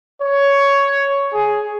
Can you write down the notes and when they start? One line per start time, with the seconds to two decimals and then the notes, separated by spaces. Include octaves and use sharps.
0.21 C#5
1.33 G#4